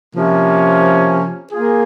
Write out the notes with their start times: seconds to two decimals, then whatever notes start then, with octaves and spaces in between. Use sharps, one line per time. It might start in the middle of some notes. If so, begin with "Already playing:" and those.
0.14 C3 F3 A#3 C#4
1.51 A#3 F4 G#4